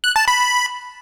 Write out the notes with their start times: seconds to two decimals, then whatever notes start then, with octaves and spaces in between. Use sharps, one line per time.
0.04 F#6
0.16 A5
0.28 B5